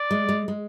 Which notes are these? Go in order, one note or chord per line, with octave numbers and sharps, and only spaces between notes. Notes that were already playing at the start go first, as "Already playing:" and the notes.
Already playing: D5
G#3
G#3
G#3